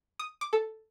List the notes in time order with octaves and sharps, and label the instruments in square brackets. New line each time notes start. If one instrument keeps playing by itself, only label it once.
[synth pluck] D#6
D6
A4